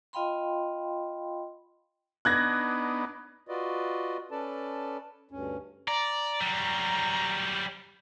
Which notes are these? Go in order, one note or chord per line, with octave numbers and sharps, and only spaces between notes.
F4 D#5 F5 G5 B5 C6
B3 D4 D#4 F#6 G#6 A#6
F4 F#4 B4 D5 D#5
C#4 A4 B4 D5 A5
D2 G2 C#4
D5 A#5
F#3 G3